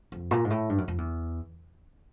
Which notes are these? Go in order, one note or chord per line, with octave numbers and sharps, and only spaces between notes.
F2
A#2
G#2
A2
G2
F#2
F2
E2